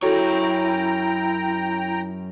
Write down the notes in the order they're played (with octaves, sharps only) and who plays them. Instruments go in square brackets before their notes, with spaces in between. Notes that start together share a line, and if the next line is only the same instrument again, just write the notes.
[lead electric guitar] F#2 C#5 [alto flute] E4 [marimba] F#4 A4 [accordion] G5 A#5